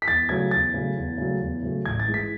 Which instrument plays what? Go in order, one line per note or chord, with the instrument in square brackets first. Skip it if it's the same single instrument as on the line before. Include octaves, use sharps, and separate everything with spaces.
[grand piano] B6
E2 A6
C#3 F#3 A3 G#6
E2 A6
C#3 F#3 A3
E2
C#3 F#3 A3
E2
C#3 F#3 A3
A1 G#6
A6
G#2 E3 G#3
B6